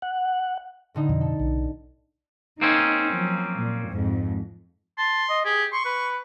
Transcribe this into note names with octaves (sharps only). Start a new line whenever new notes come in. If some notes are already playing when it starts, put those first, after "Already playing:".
F#5
A2 D3 D#4
F2 B2 F3
A4
B1
A#3 C4 C#4 D#4
F3 F#3
A#2
F2 G#2
A5 C6
D#5
G4 G#4
C6 C#6
B4